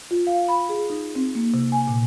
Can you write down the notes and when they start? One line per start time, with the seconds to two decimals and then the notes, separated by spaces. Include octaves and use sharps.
0.11 F4
0.27 F5
0.48 B5
0.69 G#4
0.90 D#4
1.15 C4
1.35 A#3
1.54 C3
1.72 G#5
1.88 A#2